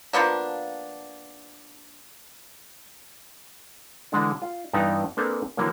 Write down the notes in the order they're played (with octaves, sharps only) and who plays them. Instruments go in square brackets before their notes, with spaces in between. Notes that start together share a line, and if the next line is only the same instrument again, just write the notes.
[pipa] F3 A#3 B3 D4
[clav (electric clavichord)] D3 E3 G#3 D4
F4
G2 E3 B3 D#4 D5 A#5
A#3 C4 D4 G#4 A4 B4
D3 E3 F#3 A#3